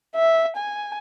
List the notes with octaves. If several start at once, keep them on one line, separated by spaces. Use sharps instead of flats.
E5
G#5